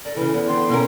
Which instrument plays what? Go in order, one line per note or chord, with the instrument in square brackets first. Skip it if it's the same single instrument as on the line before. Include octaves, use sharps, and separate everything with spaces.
[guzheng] A4 A#4 [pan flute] D5
[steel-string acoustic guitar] C#3 E3 [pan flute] E4
[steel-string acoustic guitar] E2 [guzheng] G#4
[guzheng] D3 B3 [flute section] G5 C6
[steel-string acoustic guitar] B2 C#4 A#4